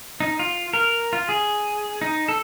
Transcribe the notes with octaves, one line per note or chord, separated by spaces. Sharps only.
D#4
F4
A#4
F4
G#4
D#4
A4